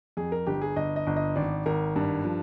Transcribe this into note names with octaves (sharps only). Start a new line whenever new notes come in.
F2 G#4
A#4
G1 G4
G#4
G1 D#5
D#5
G1
D#5
G#1 D5
G#1 A#4
G2
F3